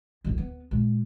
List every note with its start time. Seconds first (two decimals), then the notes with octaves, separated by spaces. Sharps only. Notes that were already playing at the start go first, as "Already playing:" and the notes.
0.24 D1 A1
0.38 B3
0.71 A#2 G#3